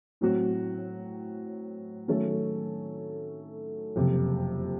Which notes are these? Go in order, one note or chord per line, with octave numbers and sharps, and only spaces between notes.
A2 F#3 C4 F#4
D#3 F#3 A3 C#4 A4
F#1 F2 C3